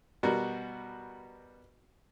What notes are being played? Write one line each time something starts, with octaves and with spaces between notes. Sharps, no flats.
B2 G3 F#4 A#4